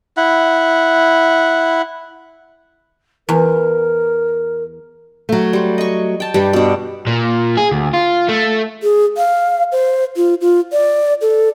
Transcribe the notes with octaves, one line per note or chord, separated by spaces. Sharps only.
E4 F#5
E2 A#4
F#3 A3
G3 C5
D#5 C#6
G5 A5
G2 G3 G4
B2 D4
A#2
G#4
D2
F4
A3
G#4
F5
C5
F4
F4
D5
A4